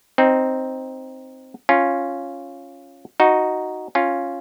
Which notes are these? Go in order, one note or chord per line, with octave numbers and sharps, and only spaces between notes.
C4 D#4
C#4 F4
D#4 F#4
C#4 F4